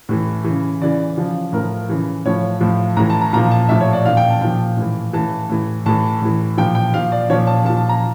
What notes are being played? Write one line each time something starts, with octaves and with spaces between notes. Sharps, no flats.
A2 E3
E3
C#3
C#3 E3 D5
C#3 F3
A2 F3 A#4
C#3 E3
A2 F3 C#5
A2 F3
A2 E3 A#5
A5
A#5
A#2 F3 A#5
A5
A2 F3 E5
C#5
D5
A#2 F3 F5
G5
A5
A#2 F3 G5
A2 E3
A2 E3 A5
A2 E3
A2 E3 A5
A2 E3
A#2 F3 G5
G5
A#2 F3 F5
D5
A#2 F3 C#5
A5
A#2 F3 A5
A5
A#5